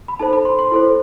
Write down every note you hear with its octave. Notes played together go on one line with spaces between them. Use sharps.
B5
D#4 A4 C5 A5
B5
C6
C6
E4 A4 C5